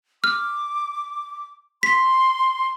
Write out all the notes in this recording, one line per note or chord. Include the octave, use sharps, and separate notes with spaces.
D6 F6
C6 B6